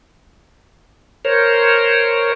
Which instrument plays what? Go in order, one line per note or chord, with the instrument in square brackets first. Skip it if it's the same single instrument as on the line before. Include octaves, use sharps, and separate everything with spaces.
[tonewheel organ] A#4 C5 C#5